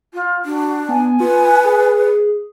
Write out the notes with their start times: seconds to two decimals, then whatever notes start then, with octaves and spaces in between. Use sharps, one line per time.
0.14 F4
0.45 D4 F#4
0.89 B3 G#5
1.20 F4 B4
1.65 G#4